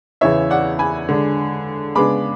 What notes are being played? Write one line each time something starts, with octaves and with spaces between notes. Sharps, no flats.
E2 C#3 E3 B3 C#5 E5
D5 F#5
G#5 B5
D3 G#3 D4
C#3 G#3 B3 D4 B5 D6